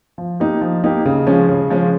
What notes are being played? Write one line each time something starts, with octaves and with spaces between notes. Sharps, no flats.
F3
A#3 D#4 G4
F3
A#3 D#4 G4
C#3
F3 G#3 C#4
C#3
F3 G#3 C#4